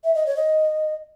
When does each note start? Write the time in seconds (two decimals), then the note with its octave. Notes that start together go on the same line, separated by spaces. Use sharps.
0.04 E5
0.15 D#5
0.26 C#5
0.37 D#5